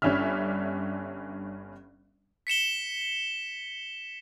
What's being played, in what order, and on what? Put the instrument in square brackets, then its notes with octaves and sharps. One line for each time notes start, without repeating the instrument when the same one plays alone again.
[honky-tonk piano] G1 G2 C#4 D4 E5 F6
[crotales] B6 C#7 E7 G7